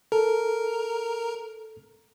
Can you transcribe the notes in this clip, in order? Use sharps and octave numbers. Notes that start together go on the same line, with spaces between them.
A4 A#4